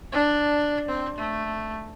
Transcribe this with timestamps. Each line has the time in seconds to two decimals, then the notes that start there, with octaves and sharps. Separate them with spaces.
0.12 D4
0.89 C4
1.18 A3